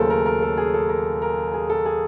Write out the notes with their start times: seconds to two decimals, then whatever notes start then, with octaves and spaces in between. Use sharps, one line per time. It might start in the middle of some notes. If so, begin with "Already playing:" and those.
Already playing: D#2 C#3 F#3 A3 A4 A#4 C5
0.10 A#4
0.26 A#4
0.42 A4
0.57 G#4
0.74 A4
0.89 A#4
1.22 A#4
1.53 G#4
1.70 A4
1.85 G#4